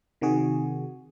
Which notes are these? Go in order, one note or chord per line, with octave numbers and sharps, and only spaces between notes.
C3 D#3 F#4 G#4